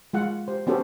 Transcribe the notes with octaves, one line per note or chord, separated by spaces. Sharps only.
G#3 F4 F#5
G4 C5
B3 C#4 F#4 G4 A4 C5